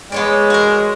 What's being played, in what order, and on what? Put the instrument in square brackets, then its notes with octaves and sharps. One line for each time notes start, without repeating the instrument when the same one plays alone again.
[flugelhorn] G#3 [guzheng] B3 C#5 D5
[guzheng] F#4 A#4